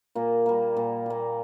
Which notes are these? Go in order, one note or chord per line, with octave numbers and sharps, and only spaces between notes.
A#2 A#3
G3 A#3
A#2
G3 A#3